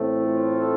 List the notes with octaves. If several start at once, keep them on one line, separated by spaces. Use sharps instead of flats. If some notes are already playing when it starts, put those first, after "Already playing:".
Already playing: A1 A2 A3 C4
F4 A4